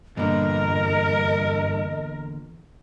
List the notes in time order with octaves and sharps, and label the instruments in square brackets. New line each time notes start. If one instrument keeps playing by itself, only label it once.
[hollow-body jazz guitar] E2 A#2 D3 [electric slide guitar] G2 [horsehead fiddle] A#4 [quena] D#5